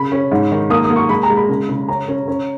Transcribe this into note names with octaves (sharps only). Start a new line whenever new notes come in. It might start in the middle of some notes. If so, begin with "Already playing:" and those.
Already playing: C#3 B5
C#4
G#2
D#3
A#3 D#6
D#6
A#3
C#6
G#3 B5
A#5
G#3
B5
C#3
C#3
C#4 A#5
C#4
C#4